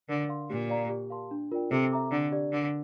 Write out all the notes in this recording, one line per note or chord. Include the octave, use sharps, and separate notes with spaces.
D3 A#4
F5 C6
A#2 G4
D5 F5 A#5
G4
A#4 F5 A5 C6
D4
F4 A#4 D5 G5
C3 A4
E5 A#5 D6
D3 D4
G4 D5
D3 A#4